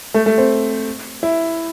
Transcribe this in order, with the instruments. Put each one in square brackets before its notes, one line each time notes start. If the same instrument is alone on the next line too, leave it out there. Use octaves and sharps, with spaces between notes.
[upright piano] A3
A3
C4
E4